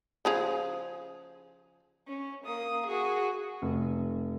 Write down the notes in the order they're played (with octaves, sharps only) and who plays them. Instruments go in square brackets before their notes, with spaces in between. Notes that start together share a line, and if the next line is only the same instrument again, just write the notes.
[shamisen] C#3 F3 G#4
[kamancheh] C#4
A#3 D#6
F#4 G#4
[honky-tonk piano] F1